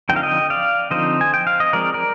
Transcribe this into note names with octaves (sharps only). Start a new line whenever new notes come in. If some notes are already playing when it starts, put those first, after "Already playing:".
D3 F3 C4 D#4 G5
F5
D#5 G5
D5 F5
D3 F3 C4 D#4 C5 D#5
G#5
G5
F5
D#5
F3 G#3 C4 A#4 D5
A#4 D5